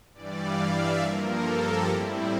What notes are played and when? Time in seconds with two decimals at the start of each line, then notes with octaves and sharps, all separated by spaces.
0.13 G2 E3 G3 D5
0.43 F5
0.72 E5
1.01 G2 F3 A#3 A#4
1.30 A4
1.59 G4
1.88 A2 G3 C4 E4